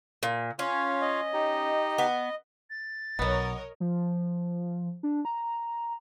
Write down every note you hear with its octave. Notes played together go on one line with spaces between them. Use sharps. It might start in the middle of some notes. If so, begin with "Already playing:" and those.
A#2
C#4 F4 C#5 F5
D#5
D#4 G4
B3
A6
B1 F#3 B3 A#4 C#5 D#5
F3
D4
A#5